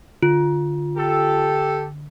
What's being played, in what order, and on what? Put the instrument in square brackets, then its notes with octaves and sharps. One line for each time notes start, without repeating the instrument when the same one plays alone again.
[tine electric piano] D3 [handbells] F4
[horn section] G4 A4